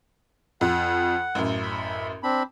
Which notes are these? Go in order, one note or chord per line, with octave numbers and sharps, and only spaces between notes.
F2 F#5
A1 F#2
B5
C4 D4 B5